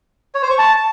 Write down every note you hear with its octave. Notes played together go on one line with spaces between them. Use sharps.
C#5
C5
C#6
A5